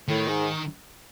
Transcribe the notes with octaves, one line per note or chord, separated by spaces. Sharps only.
A2 D#3
G#2